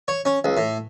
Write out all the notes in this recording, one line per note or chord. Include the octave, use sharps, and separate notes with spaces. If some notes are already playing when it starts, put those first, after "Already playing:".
C#5
C#4
C#2
A2